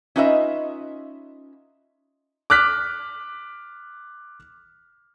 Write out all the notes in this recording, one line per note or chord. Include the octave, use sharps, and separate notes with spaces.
C#4 D#4 F4 B4 D#5 E5
D6 F6 F#6 B6